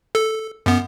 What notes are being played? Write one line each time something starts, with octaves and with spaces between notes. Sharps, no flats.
A4
F#2 B3